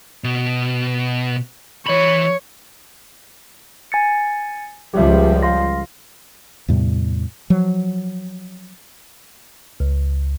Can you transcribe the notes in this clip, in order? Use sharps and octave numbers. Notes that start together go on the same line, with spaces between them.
B2
E3 C#5 B5
G#5 A6 C#7
C#2 F3 G3 G4 E5
F5 C6 A#6
E2 A2 C3 G3
F3 F#3
C#2